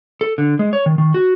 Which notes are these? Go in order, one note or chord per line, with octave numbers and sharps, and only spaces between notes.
A4
D3
G#3
C#5
D#3
D#3
F#4